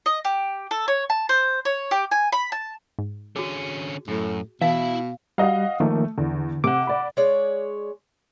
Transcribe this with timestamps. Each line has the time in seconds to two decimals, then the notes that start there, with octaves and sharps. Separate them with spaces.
0.06 D#5
0.25 G4
0.71 A4
0.88 C#5
1.10 A5
1.29 C5
1.65 C#5
1.91 G4
2.11 G#5
2.32 B5
2.52 A5
2.99 G#2
3.36 D3 C#4 F#4 G#4
4.08 F#2 A2
4.62 B2 E3 E4 E5 F5 A5
5.38 G3 F#4 D#5 F5
5.80 D#3 F3 A3 A#3
6.18 E2 D3
6.64 C3 F#5 D6
6.87 D5 B5
7.17 G#3 C#5 D5